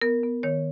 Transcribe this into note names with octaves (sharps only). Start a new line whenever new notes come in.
B3 A#4
B3
D#3 C#5